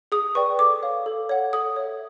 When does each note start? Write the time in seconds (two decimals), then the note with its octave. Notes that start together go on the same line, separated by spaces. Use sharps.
0.12 G#4 D#6
0.35 B4 D5 G5 C#6
0.59 A4 D6
0.82 C#5 F5
1.06 A4
1.29 C#5 F#5
1.53 A4 D#6
1.76 C#5 E5